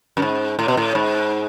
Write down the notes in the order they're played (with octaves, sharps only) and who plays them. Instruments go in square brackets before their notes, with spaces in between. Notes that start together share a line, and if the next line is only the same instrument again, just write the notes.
[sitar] F#2
G#2
A2
B2
A2
G#2